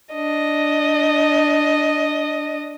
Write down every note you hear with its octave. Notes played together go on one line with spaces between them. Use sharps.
D4 D#5